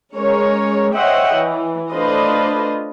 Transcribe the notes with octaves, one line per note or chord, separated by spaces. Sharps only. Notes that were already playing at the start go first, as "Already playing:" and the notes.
G#3 C#4 A#4 C#5
C5 C#5 D#5 E5 F#5 G5
E3
A3 D4 F4 B4 C5 D#5